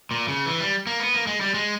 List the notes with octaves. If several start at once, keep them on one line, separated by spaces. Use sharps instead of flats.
A#2
C#3
E3
G3
A#3
B3
A#3
G#3
G3
G#3